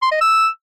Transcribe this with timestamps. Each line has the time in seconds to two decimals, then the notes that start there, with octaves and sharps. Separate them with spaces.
0.02 C6
0.12 D#5
0.21 E6